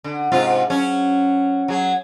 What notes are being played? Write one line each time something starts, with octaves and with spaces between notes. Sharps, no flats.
D3
G#2 C3 F4
F#3 C#4
F#3 G#4